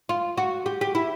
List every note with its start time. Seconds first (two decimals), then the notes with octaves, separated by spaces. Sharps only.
0.09 F4
0.38 F#4
0.66 G4
0.81 G4
0.95 E4